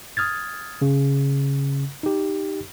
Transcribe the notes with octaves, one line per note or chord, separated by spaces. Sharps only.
D#6 F6 G#6 A6
C#3
D#4 G4